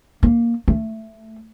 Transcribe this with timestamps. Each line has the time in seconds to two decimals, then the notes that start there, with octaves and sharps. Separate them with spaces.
0.23 A#3
0.68 A3